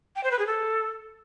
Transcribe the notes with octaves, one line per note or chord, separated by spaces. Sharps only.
G5
C5
B4
G#4
A4